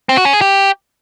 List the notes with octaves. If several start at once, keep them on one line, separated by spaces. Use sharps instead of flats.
C4
F#4
C#4
G#4
G4